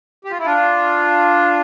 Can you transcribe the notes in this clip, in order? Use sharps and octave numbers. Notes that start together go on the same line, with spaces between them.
G4
F4
E4
D4 F4